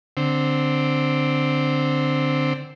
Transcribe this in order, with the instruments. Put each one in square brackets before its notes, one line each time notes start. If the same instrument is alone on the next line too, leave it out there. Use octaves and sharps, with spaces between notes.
[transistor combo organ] D3 C4